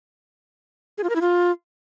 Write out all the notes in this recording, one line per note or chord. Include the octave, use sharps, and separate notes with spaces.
G#4
F4
A#4
E4
F4